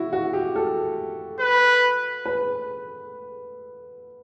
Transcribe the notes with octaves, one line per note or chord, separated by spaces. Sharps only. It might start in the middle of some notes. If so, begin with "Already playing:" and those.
Already playing: E4 F#4
F#4
G4
A4
B4
B4